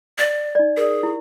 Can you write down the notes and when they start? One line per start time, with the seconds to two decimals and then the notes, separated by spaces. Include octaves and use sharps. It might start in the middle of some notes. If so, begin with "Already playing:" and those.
0.18 D5
0.55 D#4 D5
0.77 G#4 A#4 D5
1.03 E4 G4